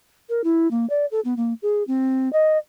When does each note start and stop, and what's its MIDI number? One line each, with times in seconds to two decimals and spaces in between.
0.29 0.41 70
0.44 0.70 64
0.71 0.88 58
0.90 1.06 74
1.11 1.20 69
1.25 1.34 59
1.37 1.54 58
1.62 1.83 68
1.87 2.31 60
2.33 2.58 75